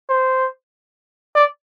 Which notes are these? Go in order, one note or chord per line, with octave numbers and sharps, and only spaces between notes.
C5
D5